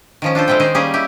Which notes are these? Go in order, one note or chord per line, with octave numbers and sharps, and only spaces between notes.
D#3 F3 C#4
D4 F4 A4 C5
G3 G#3 C4 E4 G5
D#3 C#4 D#4 G#4 C5
G3 A#3 C#4 G4 G#4
E4 G4